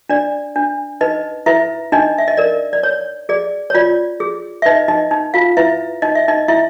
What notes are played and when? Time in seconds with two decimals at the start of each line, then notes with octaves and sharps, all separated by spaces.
0.09 D4 D5
0.56 D4
1.01 D#4 B4 D#5
1.46 E4 B4 E5
1.92 D4 D#4 D#5
2.18 E5
2.28 D#5
2.37 A#4 D5
2.73 D5
2.83 C#5
3.29 G#4 D5
3.70 C#5
3.75 F4 D5
4.20 G#4
4.62 E5
4.65 D#4 B4 D#5
4.88 D#4 D#5
5.11 D#4
5.34 F4 F5
5.57 E4 B4 E5
6.02 D#4 D#5
6.15 E5
6.28 D#4 D#5
6.48 E4 E5